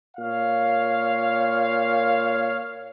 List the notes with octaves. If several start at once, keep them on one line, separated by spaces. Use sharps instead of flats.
A#2 C#5 F5